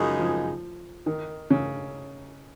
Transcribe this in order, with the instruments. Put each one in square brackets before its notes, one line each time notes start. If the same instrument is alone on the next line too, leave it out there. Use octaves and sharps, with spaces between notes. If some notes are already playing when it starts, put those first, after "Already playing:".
Already playing: [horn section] F#2 C#3 G#3 D#4 G#4 [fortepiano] F3
[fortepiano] F3
D#3
C#3